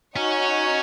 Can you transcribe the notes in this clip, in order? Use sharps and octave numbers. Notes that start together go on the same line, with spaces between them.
C#4 D#4 F#4 C#5